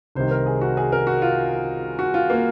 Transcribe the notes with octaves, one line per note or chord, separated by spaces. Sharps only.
C2 C3 D#3 C5
A#4
G#4
F#4
G#4
A#4
F#4
F4
F#4
F4
A#3